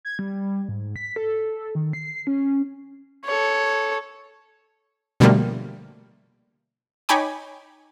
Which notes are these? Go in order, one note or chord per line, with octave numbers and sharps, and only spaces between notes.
G#6
G3
G#2
B6
A4
D#3
C7
C#4
A4 C#5
B2 D3 F3 G3 A3 A#3
D#4 C#5 G5 G#5 B5 D6